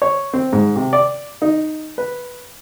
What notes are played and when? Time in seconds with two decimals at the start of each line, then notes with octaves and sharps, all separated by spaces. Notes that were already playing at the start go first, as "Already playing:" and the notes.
0.02 C#5
0.33 C4
0.53 G#2
0.76 C3
0.93 D5
1.42 D#4
1.98 B4